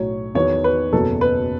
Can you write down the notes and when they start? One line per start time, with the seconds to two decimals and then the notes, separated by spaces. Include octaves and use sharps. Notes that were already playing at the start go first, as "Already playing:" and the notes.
Already playing: B1 A2 F#3 C#5
0.35 E2 D#3 F#3 B3 C#5
0.64 B4
0.92 F#1 E2 B2 F#3 B3 A4
1.21 B4